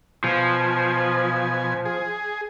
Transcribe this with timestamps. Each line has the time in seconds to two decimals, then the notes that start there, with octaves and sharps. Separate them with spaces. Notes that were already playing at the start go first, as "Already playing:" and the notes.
0.24 B2 F3 G#5
1.85 G#4